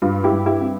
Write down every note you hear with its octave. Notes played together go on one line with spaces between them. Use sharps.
G2 F4
E4 G4
G2
E4 G4
C4